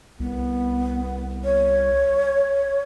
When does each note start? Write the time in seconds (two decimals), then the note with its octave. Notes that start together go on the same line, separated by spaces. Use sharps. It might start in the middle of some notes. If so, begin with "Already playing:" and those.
0.20 C2 B3
1.44 C#5